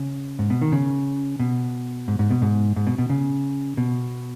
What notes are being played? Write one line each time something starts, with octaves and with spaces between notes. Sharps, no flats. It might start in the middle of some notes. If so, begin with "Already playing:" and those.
Already playing: C#3
G#2
B2
D#3
C#3
B2
G#2
G#2
B2
G#2
G#2
B2
B2
C#3
B2